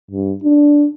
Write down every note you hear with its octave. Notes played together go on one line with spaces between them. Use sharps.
G2
D4